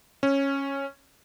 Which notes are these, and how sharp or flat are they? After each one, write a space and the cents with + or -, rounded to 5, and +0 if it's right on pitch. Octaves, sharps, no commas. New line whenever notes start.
C#4 -10